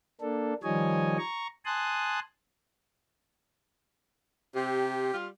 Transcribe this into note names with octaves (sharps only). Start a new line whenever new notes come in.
A#3 D4 A4
D#3 F3 G3 C#5 D#5 G#5
A#5 C#6
G#5 A5 C6 D#6 F#6
C3 G4
G3 F4